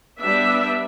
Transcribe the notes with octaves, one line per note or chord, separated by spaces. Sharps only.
G3 B3 D4 E5